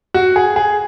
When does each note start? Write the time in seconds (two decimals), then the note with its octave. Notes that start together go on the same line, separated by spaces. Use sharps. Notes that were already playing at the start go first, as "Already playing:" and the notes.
0.14 F#4
0.36 G#4
0.56 G#4